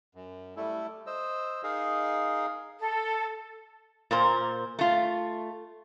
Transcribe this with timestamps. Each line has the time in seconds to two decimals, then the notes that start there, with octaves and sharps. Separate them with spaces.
0.15 F#2
0.57 G3 A3 E4 A4
1.06 C5 D#5 E6
1.64 D#4 G#4 A#4 D#5 F5
2.79 A4
4.11 A#2 A#4 C5
4.79 A3 F4